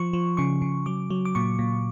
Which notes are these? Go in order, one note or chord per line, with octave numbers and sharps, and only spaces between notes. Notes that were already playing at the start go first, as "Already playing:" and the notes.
Already playing: F3 C#6
F3
C#3 C#6
C#3
F#3 D6
F#3
D6
A#2 C#6
A#2